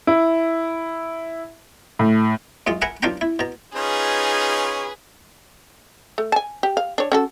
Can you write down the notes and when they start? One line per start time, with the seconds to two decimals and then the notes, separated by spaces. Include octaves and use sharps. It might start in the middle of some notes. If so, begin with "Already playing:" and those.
0.07 E4
1.99 A2
2.67 F#2 G#3 F4
2.82 A#4 E5 F#5 G#5 A#5 B5
3.03 B1 D4 F4 F5 G5 A#5
3.21 E4
3.39 B2 A#5
3.75 C#4 D#4 F4 G#4 B4
6.18 A3
6.32 G#5 A5
6.63 G4
6.77 F5
6.98 D4 C#5
7.12 C#4 F#4 A4